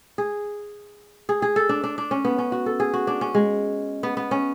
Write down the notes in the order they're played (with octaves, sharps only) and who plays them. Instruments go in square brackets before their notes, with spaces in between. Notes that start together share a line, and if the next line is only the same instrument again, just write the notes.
[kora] G#4
G#4
G#4
A4
D4
D4
D4
C#4
B3
C#4
F#4
A4
G#4
F#4
D4
C#4
G#3
B3
B3
C#4